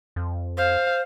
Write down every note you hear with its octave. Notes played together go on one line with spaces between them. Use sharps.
F2
C5 F5